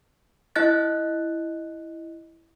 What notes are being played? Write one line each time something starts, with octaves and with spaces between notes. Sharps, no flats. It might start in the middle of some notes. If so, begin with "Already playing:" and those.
E4 D#5 F#6 A6